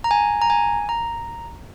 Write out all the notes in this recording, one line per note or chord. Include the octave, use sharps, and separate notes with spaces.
A#5
G#5
A#5
G#5
A#5